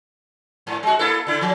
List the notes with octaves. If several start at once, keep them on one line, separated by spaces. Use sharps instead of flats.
G#2
G#3 F#4
A#3 E4 A4
D3 E4
F3 F#3